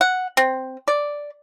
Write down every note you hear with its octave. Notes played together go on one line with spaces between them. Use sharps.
F#5
C4
D5